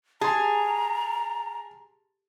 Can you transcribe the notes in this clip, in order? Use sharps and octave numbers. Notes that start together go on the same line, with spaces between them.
G#4 A5 A#5 C6